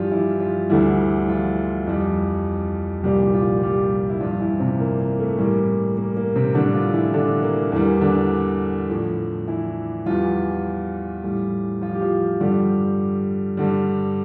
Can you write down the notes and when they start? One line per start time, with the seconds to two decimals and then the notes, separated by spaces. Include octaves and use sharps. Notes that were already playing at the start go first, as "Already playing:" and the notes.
Already playing: G2 E3 F3 G3 F4 G4
0.11 E3 E4
0.40 F3 F4
0.69 D2 D3 E3 G3 E4
1.28 F3 F4
1.86 F2 E3 G3
3.03 C2 A#2 F3 G3 G4
3.33 F3 F4
3.63 G3 G4
4.10 E4
4.20 G2 F3 F4
4.40 E3 E4
4.60 C3 C4
4.80 A#3
5.00 A#3
5.19 A3
5.38 A2 E3 G3 A#3
5.97 A#3
6.17 A#3
6.36 C3 C4
6.55 A2 D3 G3 D4
6.74 F3 F4
6.94 E3 E4
7.14 D3 D4
7.42 A#3
7.72 E2 E3 G3 A#3
8.01 D3 D4
8.90 A2 F3
9.48 E3 E4
10.06 E2 E3 F3 G3 F4
11.23 A2 E3 G3
11.82 F3 F4
11.95 G4
12.01 F3 F4
12.40 G2 D3 F3 G3 G4
13.57 G2 D3 G3